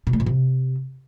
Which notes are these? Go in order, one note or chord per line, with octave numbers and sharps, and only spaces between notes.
B2
A3
A#2
C3